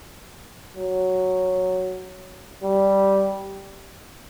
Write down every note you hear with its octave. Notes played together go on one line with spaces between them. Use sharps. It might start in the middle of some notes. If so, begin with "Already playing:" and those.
F#3
G3